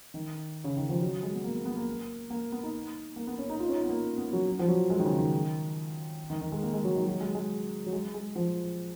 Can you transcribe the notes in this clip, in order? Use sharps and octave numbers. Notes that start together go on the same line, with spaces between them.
D#3
C#3
D#3
F3
F#3
G#3
B3
A#3
B3
B3
A#3
A#3
B3
D#4
A#3
B3
C#4
D#4
F4
C#4
D#4
B3
A#3
B3
F#3
F3
F#3
G#3
D#3
C#3
D#3
D#3
D#3
G#3
A#3
G#3
F#3
D#3
F#3
G#3
G#3
F#3
G#3
G#3
F3